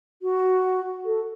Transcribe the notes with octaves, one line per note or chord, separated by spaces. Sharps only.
F#4
A4